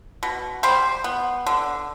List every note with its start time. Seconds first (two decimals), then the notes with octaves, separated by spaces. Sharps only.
0.23 B2
0.63 G3 C5
1.04 B3
1.46 D3